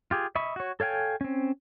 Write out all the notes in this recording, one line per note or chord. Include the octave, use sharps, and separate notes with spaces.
F4 G4 G#4
D#5 E5 B5 C#6
F#4 C#5
A4 C#5 F5 G5 G#5
C4 C#4